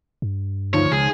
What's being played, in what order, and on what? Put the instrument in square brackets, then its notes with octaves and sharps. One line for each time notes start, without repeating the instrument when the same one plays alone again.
[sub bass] G2
[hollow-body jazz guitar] D2 [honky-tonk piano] D#3 F3 [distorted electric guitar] C#5
[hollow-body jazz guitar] C#2 [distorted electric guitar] G#4